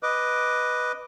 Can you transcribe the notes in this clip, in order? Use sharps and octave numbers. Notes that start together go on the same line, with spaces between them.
B4 D#5 D6